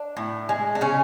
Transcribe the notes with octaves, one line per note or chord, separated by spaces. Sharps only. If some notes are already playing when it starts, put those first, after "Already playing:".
Already playing: D4
A2
G#3
D4
C#3 C#4